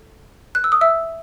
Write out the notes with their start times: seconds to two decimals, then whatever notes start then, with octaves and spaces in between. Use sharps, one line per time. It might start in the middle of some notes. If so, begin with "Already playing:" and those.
Already playing: A4
0.55 F#6
0.64 E6
0.72 D#6
0.81 E5 E6